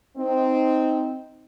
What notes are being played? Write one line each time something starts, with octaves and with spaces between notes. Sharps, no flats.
C4 D#4